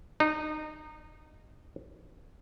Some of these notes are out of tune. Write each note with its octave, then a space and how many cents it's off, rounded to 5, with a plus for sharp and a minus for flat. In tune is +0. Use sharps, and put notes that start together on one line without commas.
D#4 -20